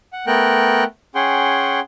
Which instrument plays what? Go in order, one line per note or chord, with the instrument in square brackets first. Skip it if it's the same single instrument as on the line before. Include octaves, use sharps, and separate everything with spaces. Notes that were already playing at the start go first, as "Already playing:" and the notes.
[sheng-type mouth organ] F#5
A3 B3 A#4 G5 F#6
C#4 G#4 F#5 G5 C6